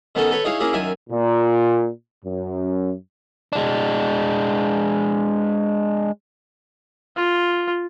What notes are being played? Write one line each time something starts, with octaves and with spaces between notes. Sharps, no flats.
D#3 B3 C#4 D#4 A4
A4 B4 C#5
D#4 E4 G#4 C#5 F5
A#3 C#4 E4 G#4 A#4
F#2 D#3 E5 G#5
A#2
F#2
G#3 D4
F4